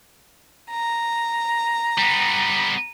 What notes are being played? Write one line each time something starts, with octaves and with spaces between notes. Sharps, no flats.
A#5
G3 B3